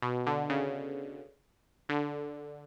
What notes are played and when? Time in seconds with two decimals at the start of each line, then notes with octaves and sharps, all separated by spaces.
0.02 B2
0.27 D3
0.50 C#3
1.89 D3